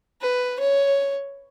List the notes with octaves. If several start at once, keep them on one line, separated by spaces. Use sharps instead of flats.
B4
C#5